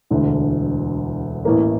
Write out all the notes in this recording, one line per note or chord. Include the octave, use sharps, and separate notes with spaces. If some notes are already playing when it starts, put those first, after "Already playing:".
E1 D2 D3
A1 A2 E3 A#3